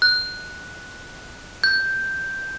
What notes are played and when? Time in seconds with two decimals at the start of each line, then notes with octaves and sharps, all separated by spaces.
0.02 F#6
1.64 G6